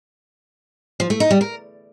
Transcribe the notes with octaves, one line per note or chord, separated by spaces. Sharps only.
F3
A3
D#4
G3
A#4